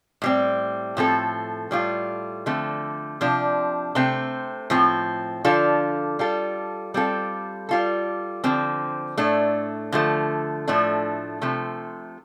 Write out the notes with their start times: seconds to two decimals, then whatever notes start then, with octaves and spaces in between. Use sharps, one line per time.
0.22 A2 G3 C4
0.97 A2 F3 C4 A4
1.71 A2 G3 F4 A4
2.46 D3 F3 A3 C4
3.21 C3 F3 D4
3.95 C3 A3 C4
4.70 A2 F3 C4
5.45 D3 F3 D4 F4 A4
6.19 G3 F4 A4
6.94 G3 C4 F4 A4
7.69 G3 F4 A4
8.44 D3 F3 C4
9.18 A2 A3 D4
9.92 D3 F3 A3
10.68 A2 F3 A3 D4
11.42 C3 F3 A3